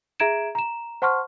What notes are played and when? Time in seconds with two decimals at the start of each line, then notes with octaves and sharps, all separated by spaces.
0.20 G#4 E5 A#5 G#6 D7 E7
0.55 A#5 E7
1.02 C5 F#5 A5 C6 C#6 F6